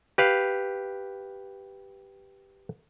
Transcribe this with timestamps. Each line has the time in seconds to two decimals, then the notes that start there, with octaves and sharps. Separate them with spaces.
0.18 G4 B4 F5